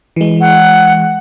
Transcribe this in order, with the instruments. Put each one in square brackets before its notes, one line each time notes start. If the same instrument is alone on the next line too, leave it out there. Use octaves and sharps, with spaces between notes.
[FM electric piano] E3 G#3
[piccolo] F#5